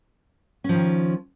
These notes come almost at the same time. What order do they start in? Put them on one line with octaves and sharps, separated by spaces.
C#4 F3 D#3